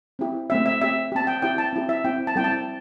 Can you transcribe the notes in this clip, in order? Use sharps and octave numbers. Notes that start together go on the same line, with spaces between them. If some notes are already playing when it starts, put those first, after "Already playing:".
C4 E4 G4
A3 C4 G4 E5
E5
C4 G4 E5
C4 G4 A5
G5
C4 E4 G4 G5
A5
C4 E4 G4
E5
C4 E4 G4 G5
A5
G3 C4 E4 G5
A5